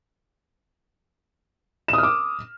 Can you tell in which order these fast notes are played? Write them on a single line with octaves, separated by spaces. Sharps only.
E7 D#6 F6 D6